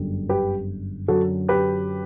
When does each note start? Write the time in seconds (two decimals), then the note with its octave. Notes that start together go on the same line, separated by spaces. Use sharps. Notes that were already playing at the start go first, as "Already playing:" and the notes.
Already playing: G1 F#2 D3 G3
0.29 G4 B4
1.08 F#2 D3 F#3 F#4 A4
1.49 G4 B4